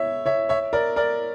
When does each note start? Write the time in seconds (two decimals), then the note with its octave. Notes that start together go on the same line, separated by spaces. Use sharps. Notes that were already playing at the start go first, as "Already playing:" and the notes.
Already playing: C#5 E5
0.26 C#5 E5
0.49 C#5 E5
0.73 A#4 D5
0.96 A#4 D5